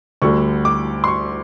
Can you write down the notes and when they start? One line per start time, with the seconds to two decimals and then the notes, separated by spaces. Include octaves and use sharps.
0.22 D2 D3 G3 C#6
0.65 D6
1.04 C6
1.08 C#6